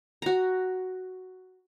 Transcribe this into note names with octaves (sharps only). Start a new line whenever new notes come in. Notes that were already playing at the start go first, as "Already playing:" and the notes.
F#4 A#5